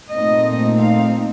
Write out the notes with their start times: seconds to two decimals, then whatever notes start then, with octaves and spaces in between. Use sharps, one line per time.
0.12 A#2 A3 C4 D#4 D#5
0.80 F5